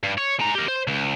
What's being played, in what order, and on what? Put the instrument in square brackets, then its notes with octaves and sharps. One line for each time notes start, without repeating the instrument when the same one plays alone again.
[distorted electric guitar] G2
C#5
G#3 A#5
G4 A#4
C5
C#2